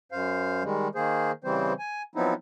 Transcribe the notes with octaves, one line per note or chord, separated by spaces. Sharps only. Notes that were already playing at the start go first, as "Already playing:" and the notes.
F#2 C5 F5
D#3 G3 G#3
D#3 A#3 G#4 C5
C#3 E3 G3 C4 C5
G#5
F3 F#3 B3 C4 D#4 E4